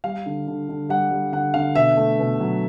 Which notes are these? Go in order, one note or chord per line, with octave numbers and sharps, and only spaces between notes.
G3 F5
D3
D3
D3
G3 F#5
G3
D3 F#5
D3 F5
B2 E5
A3
B2
F#3